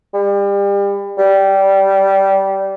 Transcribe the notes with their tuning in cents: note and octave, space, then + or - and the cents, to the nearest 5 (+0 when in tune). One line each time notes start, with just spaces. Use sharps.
G3 +35
G3 -15